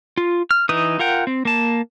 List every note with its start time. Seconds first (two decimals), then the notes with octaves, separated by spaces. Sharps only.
0.18 F4
0.51 F6
0.69 E3 D#4 B4 D#6
0.99 F4 A#4 F#5 G5
1.27 C4
1.45 A#3 A5